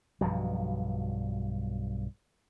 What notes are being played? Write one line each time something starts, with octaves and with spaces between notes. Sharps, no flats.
B1 G2 F3 F#3